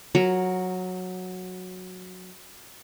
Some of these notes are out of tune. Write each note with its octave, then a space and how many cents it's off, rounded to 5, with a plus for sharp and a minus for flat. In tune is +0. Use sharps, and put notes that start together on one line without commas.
F#3 -10 A#4 +0